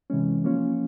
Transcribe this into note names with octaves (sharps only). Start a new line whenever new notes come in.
C3 E3 G#3 C#4
F3 A#3 C#4 F4